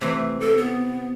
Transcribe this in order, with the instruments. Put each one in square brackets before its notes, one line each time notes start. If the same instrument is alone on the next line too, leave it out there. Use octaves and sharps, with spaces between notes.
[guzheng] C3 E3 [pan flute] A3
[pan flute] A4
B3